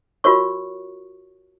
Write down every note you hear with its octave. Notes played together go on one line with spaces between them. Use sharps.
F4 F#4 A#4 C#5 C#6